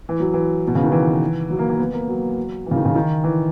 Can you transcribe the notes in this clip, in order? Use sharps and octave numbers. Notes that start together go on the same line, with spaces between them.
E3
F#3
E3
B2
C#3
D#3
E3
F#3
A#3
A#3
B3
A#3
F#3
E3
C#3
D#3
C#3
D#3
E3